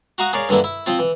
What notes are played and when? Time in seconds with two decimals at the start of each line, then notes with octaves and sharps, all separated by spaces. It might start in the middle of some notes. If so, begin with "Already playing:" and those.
0.18 F#4 F5 F#5 A#5 C#6 D#6
0.33 G#4 A#4 C#5 D5 F5
0.49 G2 D3 E3 A#3 E4
0.64 E4
0.86 F3 C4 F4
0.99 E3